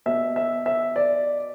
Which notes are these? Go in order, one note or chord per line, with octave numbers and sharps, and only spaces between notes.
B2 E5
E5
E5
D5